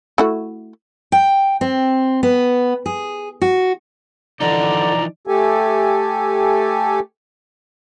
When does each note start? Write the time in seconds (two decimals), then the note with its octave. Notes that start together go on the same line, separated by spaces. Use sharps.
0.18 A3 E4 F#4
1.12 G5
1.61 C4
2.23 B3
2.86 G#4
3.42 F#4
4.40 D3 E3 F3 D#4 D5 A#5
5.27 A3 G4 A4 G#5